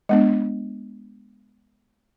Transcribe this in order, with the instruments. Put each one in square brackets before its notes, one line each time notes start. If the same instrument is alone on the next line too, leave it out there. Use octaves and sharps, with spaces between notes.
[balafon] G#3 B3 D4